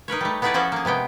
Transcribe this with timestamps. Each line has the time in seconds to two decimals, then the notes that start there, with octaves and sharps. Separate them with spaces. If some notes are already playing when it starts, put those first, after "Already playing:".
0.08 D#4 A#4 B4 C#5
0.21 G3 A3
0.42 B3 D#4 E4 G#4 B4 D5
0.54 F3 C#4 F#4 A4 C5
0.72 A#3 G#4
0.85 C3 G#3 B3 G5